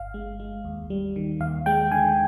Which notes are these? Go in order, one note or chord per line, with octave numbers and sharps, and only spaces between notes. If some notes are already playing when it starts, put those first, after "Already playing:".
Already playing: G1 F5
G#3
G#3
D#2
G3
D#3
D#2 F5
G#3 G5
D3 G#5